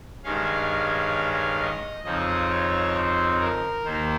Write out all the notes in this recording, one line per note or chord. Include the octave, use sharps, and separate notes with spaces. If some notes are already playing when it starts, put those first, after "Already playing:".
G2 D#3 G#3 C#4 F5
D#5
F2 C#3 F3 C4 D#4 D#5
C#5
C5
A#4
D#2 D#3 A#3 D#4 C5